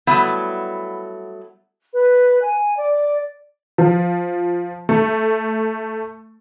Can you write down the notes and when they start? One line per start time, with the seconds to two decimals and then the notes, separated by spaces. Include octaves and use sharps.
0.07 F#3 G3 A3 B3 E4
1.93 B4
2.42 G#5
2.77 D5
3.78 F3
4.89 A3